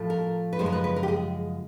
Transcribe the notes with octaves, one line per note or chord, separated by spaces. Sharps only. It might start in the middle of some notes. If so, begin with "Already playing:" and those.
Already playing: A2 F3 A3
A#4
B4
F#2 C#3 F3 G#3 C5
A#4
B4
B4
A#4
G4
G#4